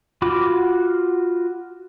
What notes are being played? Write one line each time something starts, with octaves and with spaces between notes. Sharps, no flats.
F4 F#4 B5 D6